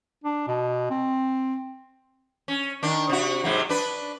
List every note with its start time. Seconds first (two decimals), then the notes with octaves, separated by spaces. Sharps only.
0.24 D4
0.47 B2
0.90 C4
2.48 C#4
2.83 D#3 D4
3.10 C3 F#4
3.44 G#2 C3 F#3
3.69 D4 B4